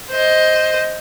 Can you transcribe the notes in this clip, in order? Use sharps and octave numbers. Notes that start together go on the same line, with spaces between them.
C5 D#5